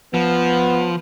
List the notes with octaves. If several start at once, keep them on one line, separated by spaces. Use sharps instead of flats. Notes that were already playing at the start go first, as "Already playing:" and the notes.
F3 B3